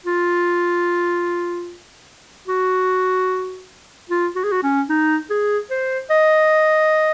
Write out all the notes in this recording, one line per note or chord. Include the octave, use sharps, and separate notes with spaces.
F4
F#4
F4
F#4
G#4
F#4
C#4
D#4
G#4
C5
D#5